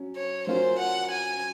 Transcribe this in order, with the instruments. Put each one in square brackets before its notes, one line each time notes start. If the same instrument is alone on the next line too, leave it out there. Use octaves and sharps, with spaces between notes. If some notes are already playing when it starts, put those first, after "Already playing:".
Already playing: [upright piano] F#3 C#4
[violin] C#5
[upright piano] F#3 C#4 F4 A#4 [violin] C5
[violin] F#5
G#5